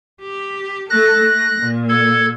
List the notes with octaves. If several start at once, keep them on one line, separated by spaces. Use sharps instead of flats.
G4
A3 A4 F#6 A#6
A3
A#2
A4 G#6